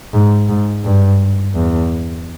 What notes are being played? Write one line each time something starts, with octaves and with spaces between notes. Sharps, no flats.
G#2
G#2
G2
E2